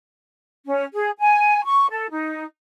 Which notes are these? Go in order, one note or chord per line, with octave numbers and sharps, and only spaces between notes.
C#4
G#4
G#5
C#6
A4
D#4